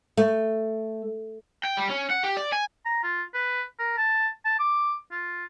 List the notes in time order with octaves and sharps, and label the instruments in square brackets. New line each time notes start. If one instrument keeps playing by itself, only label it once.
[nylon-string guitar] A3
[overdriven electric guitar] G5
G3
C#4
F#5
G4
D5
G#5
[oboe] A#5
F4
B4
A#4
A5
A5
D6
F4